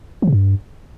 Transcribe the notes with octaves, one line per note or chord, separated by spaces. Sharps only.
F3
C3
G2